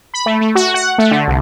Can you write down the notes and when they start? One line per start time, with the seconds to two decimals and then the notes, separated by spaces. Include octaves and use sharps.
0.14 B5
0.26 A3
0.41 A3
0.55 F#4
0.74 F#5
0.98 A3
1.11 D3
1.28 C2